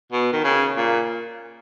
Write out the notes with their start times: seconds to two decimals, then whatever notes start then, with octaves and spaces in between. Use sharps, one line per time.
0.12 B2
0.33 D#3
0.44 C#3
0.76 A#2